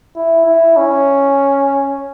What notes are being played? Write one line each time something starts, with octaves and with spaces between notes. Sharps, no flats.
E4
E4
C#4